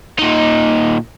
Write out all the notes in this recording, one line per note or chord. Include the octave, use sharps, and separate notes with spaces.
A#2 D#4